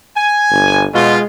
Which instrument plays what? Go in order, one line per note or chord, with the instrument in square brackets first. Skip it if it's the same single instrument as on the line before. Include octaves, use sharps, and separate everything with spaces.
[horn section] G#5
[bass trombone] G1
[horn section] B2 F4 [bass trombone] G#3